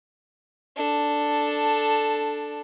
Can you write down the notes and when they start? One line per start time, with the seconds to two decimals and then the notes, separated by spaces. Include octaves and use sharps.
0.77 D4 A4